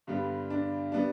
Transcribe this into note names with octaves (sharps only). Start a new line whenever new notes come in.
G2 D3 G3 B3
D4
G3 B3 D4